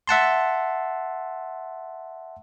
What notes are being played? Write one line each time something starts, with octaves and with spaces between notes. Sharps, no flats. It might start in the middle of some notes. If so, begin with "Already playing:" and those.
E5 F#5 A5 C6